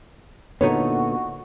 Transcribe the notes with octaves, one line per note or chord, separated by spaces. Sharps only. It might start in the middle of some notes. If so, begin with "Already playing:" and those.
A#2 D3 B3 D#4 F#4 A4 C#5